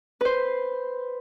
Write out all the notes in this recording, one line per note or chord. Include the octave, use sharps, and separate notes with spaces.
B4 C5